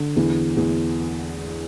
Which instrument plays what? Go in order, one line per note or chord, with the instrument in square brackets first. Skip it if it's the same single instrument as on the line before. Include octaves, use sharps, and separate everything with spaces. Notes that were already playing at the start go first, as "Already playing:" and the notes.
Already playing: [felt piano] D3
E2
E2